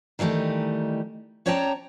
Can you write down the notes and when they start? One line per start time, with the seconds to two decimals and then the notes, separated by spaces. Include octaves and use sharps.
0.19 D#3 E3 G3 A3 D#4
1.46 C#4 C#5 D5 G5 A5 A#5